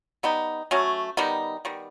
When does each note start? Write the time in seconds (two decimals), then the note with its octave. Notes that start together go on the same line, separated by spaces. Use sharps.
0.23 G3 B3 D#4
0.71 F#3 A3 C#4
1.17 D#3 G3 B3 D#4
1.65 D#3 G3 B3